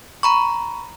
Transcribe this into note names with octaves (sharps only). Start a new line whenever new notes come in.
A#5 B5 C#6